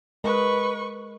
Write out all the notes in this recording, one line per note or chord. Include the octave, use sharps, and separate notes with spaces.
G#3 A#4 B4 D#5 C#6